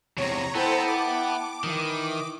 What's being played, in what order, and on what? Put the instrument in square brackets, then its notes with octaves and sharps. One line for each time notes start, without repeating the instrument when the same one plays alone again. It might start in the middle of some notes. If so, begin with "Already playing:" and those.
[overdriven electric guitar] E2 C3 [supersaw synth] C#5 A#5
[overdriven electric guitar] B3 [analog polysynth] E4 G5 A5 [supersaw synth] A4 C5 A#5
[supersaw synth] D6
[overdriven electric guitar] D#3 [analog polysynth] E3 D#6